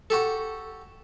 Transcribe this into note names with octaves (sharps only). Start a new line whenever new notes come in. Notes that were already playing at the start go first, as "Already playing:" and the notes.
F#4 G4 A4